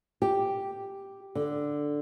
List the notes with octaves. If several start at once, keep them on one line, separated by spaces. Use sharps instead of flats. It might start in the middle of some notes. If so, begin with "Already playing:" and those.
G4
D3